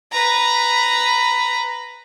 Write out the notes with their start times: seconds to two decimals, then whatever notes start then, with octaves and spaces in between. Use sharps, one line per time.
0.12 B4 A#5